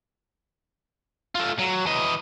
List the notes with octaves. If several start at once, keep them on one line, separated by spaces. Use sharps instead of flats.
A3 F4
F#3
E3 D#5